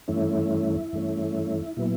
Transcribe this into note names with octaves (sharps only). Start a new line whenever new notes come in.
G2 E3 A3 C#4 E4
G2 E3 A3 C#4
A#2 F#3 B3 E4